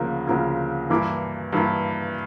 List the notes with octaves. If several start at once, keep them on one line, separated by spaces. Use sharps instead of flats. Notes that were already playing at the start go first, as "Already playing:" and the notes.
Already playing: D2 C#3 F3 A#3
D2 C#3 F3 A#3
G2 E3 A#3 E4 D6
G2 E3 A#3 E4